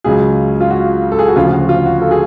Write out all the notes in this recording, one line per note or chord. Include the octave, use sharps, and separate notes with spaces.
C#2 C#3 F#3 G#4
F4
F#4
A4
G#4
F#4
D2 C#3 F3 F4
F4
F#4
F4
F#4
A4
G#4